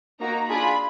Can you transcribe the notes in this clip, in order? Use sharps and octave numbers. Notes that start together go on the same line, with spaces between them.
A#3 D#4 F#4 A#5
D4 F4 G#4 B5